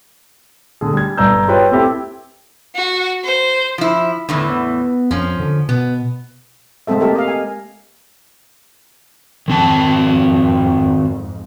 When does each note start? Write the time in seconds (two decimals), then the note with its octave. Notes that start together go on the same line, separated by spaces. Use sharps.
0.81 D3 G#4
0.93 G3 G#6
1.17 G1 G2 D5 A#5 E6 G6
1.48 F4 G4 G#4 B4 C#5 G5
1.72 C4 E4 G4 A4
2.75 F#4
3.24 C5
3.78 F3 E4
4.29 E2 A2 D3 E3
4.50 B3
5.11 F2 F3 C#4
5.40 D3
5.69 B2 B3
6.87 G#3 A3 C4 A4 E5
7.00 G#3 A#3 G4 A4 A#4 E5
7.16 D#5 F5
7.28 G#5
9.48 F2 G#2 D#3 C4 A5